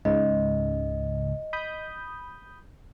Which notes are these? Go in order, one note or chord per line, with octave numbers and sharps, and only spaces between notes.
C#2 G#2 C#3 D#5
B5 D#6 G6